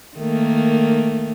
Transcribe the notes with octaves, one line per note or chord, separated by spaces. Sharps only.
D#3 A3 A#3